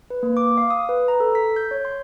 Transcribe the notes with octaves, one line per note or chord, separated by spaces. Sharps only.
B4
A#3
D6
F5
D#6
B4
A#5
A4
B6
G6
C#5
C6